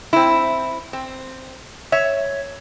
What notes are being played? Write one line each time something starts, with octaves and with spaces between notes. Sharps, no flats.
C4 E4
C4
C#5 E5